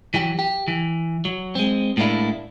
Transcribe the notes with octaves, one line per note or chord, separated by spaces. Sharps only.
E3 F#3 G4
G4
E3
F#3
G#3 C4
A2 G#3 A#3 D4 E4